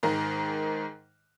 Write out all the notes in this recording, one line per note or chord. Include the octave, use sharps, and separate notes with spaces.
G#2 D#3 A#4